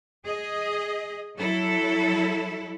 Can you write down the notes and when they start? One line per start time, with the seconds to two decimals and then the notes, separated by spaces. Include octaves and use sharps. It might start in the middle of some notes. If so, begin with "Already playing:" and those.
0.24 G#4 D#5
1.36 F#3 E4 A4